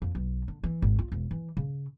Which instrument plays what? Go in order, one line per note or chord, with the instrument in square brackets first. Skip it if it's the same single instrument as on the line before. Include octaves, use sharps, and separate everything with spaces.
[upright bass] F2
B1
D3
E3
G#1
F4
E1
E3
C#3